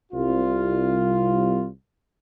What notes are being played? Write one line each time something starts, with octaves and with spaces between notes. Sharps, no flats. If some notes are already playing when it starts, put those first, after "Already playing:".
C2 F4